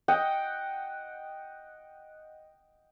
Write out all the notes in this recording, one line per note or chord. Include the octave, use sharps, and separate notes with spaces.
D#5 F#5 G5